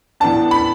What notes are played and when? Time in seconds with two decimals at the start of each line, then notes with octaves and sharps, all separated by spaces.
0.20 A2 E3 B3 D4 A5
0.51 B5